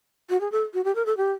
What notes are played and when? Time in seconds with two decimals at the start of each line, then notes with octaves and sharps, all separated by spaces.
0.30 F#4
0.41 G#4
0.52 A4
0.74 F#4
0.84 G4
0.95 A#4
1.06 A4
1.17 G4